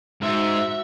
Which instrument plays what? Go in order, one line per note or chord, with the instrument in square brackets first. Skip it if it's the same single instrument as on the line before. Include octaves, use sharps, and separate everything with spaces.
[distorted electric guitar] G#2 [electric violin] F#4 E5